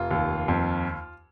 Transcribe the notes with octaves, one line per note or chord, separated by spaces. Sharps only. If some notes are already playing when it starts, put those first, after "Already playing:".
Already playing: F1 F4
D#2
F2